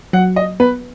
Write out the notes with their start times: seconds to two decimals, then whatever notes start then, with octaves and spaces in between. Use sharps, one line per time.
0.13 F#3 F#5
0.36 D#5
0.60 B3 B4